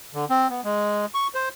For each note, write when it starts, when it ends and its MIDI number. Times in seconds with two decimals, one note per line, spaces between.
0.14 0.25 50
0.30 0.48 60
0.50 0.61 59
0.64 1.06 56
1.14 1.27 85
1.35 1.49 72